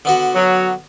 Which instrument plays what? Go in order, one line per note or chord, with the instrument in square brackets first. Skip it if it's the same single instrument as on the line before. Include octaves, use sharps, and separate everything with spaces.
[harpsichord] D3 B3 F#4
[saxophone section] F#3